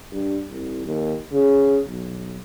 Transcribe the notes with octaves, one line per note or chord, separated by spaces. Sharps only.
G2
C2
D#2
C#3
B1